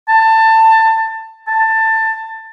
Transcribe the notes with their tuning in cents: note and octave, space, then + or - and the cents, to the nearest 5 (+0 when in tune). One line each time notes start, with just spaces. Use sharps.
A5 +20
A5 +15